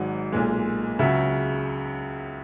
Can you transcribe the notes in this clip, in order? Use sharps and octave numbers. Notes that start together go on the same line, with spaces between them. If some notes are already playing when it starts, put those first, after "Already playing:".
Already playing: G#1 G#2 F#3
B1 A#2 G#3
C#2 C#3 F#3 E5